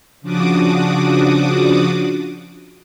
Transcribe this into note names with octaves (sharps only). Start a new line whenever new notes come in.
C#3 F3 D4 F#4 D6 D#6